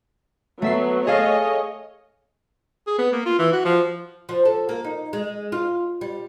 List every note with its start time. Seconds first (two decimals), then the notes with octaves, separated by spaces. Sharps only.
0.62 F#3 A3 B3 E5 C7
1.07 G#4 A4 C#5 D#5 F5
2.87 G#4
2.98 B3
3.13 A#3
3.26 F4
3.39 E3
3.53 F#4
3.65 F3
4.29 F3
4.45 A4
4.69 A#3
4.84 D#4
5.13 G#3
5.52 F4
6.01 G3